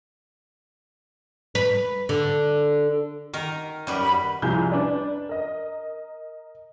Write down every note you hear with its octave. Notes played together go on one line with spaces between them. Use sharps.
B4
D3
D#3 A#4
F#2 G3 B4
B5
C2 F3 G#4 G6
D4 B4 D5
A#4 D#5